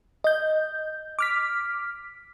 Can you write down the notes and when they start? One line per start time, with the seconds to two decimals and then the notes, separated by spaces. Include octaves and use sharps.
0.24 D#5 G6
1.19 D6 F6 B6